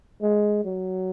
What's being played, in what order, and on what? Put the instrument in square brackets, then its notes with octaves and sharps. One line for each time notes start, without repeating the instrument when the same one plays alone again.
[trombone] G#3
F#3